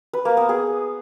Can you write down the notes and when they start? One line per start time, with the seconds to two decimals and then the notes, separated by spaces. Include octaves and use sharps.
0.13 B4
0.25 A#3
0.37 B3
0.49 G#4